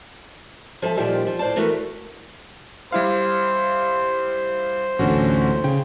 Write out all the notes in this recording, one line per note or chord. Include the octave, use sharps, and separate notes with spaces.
F3 A4 E5 A5
A#2 D#3 F3 G3
F3
A2 C5 D5 A5
E3 A3 F#4 A#4 B4
G3 E4 C5 F5
A1 D2 D3 C#4 F#4
C#3 G5